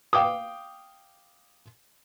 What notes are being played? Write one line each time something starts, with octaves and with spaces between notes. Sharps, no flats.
F5 G5 D6 D#6